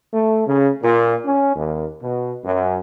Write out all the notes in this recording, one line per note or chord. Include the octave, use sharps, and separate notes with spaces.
A3
C#3
A#2
C#4
D#2
B2
F#2